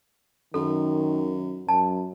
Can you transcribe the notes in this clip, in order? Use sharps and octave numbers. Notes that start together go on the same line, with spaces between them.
F#2 D#3 A4
F#2 A5